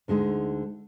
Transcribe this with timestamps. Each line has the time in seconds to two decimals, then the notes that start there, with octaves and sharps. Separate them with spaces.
0.08 D2 D3 G#3 D#4